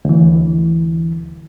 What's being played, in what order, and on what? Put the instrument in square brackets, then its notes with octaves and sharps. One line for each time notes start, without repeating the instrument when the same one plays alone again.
[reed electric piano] D2 E3